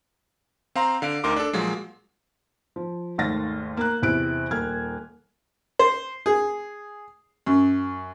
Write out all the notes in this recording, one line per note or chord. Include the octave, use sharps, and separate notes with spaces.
C4 F5 A#5 C6
D3 F5 D7
D2 D#4 A#4 C6 D6
D4 A4
A#2 F3 F#3 G#3
F3
G#1 D#2 A3 F5 A6 A#6
A#3 A#5 F#6
E2 C3 E4 F#6 D7
D#1 A#3 F6 G#6
C5
G#4
F#2